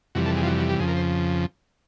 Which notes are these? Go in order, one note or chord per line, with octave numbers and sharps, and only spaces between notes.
F2 C3 E3 G3 F#4
A4
G#4
F4
F#4
F#4
G4
F2 C#3 F3 G#4
A#4
C5